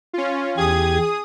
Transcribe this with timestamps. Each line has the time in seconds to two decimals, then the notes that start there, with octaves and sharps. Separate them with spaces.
0.13 C#4 F4
0.57 E2 G4 G#4 D#6 G#6